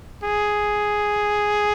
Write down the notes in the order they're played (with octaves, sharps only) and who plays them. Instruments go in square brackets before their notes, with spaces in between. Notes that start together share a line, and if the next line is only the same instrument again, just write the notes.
[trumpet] G#4